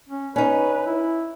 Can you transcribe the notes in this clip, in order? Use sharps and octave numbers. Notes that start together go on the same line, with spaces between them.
C#4
C#4 D#4 B4
E4